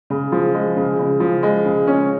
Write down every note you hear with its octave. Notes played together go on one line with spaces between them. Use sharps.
C#3
F3
G#3
C#3
C#3
F3
G#3
C#3
C#4